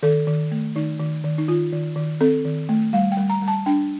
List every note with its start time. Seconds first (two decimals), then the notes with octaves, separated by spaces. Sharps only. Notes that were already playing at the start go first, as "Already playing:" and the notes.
0.03 D#3 A4
0.27 D#3
0.51 A3
0.76 D#3 D#4
1.00 D#3
1.24 D#3
1.38 D#4
1.48 D#3 F4
1.72 D#3
1.96 D#3
2.21 C4 A4
2.45 D#3
2.69 A3
2.93 G3 F5
3.12 G5
3.17 G3
3.30 A#5
3.42 G3
3.48 A5
3.66 D4 G5